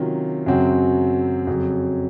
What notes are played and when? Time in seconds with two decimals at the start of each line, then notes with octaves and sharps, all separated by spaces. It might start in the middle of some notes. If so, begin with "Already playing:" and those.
Already playing: C3 D#3 F#3 C#4 F4
0.46 F#2 C#3 F#3 C4 F#4
1.47 F2 C#3 F#3